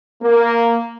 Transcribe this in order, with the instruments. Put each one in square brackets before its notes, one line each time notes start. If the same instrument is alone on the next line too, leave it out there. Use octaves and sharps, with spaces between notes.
[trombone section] A#3